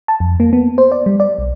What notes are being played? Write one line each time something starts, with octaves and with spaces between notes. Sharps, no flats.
A5
F2
A#3
B3
C5
D5
G3
D5
B1